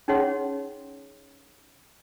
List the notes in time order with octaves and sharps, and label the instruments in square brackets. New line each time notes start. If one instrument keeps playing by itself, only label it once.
[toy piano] C#4 D#4 G#4 C#5 F#5 C6